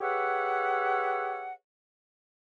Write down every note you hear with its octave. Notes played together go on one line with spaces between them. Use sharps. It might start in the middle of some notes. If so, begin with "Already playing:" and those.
G4 G#4 B4 C#5 E5 F#5